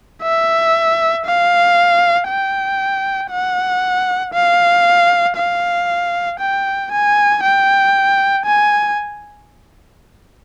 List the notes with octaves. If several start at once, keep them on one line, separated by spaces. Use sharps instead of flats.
E5
F5
G5
F#5
F5
F5
G5
G#5
G5
G#5